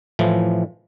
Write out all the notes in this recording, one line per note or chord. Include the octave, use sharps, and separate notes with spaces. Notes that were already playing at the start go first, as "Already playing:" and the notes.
A2 E3 F3